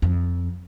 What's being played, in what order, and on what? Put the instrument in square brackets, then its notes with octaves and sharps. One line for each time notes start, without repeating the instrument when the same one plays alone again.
[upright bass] F2